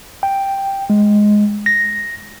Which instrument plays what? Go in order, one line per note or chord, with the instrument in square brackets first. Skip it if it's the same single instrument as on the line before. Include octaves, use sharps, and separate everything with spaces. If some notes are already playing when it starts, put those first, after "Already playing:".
[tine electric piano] G5
G#3
A#6